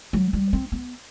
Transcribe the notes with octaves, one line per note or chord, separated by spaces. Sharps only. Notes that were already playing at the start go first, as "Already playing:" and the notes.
F#3
G3
C4
B3